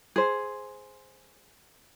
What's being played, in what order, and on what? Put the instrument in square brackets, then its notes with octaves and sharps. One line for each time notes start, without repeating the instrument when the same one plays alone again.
[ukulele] G#4 C5